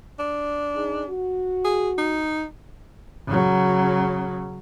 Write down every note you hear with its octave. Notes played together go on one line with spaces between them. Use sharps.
D4
D#4 G#4
F#4
G#4
D#4
C#3 F#3